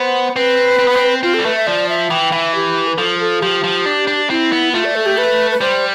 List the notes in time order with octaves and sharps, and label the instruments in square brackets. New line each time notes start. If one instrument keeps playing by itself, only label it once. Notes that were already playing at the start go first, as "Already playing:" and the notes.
Already playing: [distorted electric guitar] B3 [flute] C5
[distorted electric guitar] C4 [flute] B4
[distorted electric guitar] C4
B3
C4
[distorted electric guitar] C4 [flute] F4
[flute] A4
[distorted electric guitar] G3
[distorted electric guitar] A3 [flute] B4
[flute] E5
[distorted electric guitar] F3 [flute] D5
[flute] E5
[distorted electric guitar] E3 [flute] G5
[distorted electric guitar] E3 [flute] E5
[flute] G4
B4
[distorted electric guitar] F3 [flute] A4
[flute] A4
[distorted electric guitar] F3 [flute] G4
[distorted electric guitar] F3
D4
D4
[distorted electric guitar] C4 [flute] E4
[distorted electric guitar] B3
[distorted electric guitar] A3 [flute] F4
[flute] D5
A4
G4
B4
B4
[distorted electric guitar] G3 [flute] C5